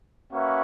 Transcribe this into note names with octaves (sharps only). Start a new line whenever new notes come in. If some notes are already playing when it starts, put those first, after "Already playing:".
A#3 C#4 F#4 B4 E5